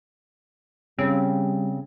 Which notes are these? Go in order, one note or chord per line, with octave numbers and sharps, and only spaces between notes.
C#3 G3 C4 F5